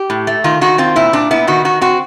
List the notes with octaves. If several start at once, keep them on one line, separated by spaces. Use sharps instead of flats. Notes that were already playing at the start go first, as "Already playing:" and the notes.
Already playing: G4
A2
A3
D#3 F4
D#3 F#4
C4 F4
A#2 E4
A#2 D4
B3 E4
D#3 F#4
D#3 F#4
C4 F#4